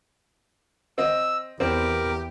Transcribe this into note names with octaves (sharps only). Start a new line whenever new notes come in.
C4 D#5 E6
E2 C4 G4 A#4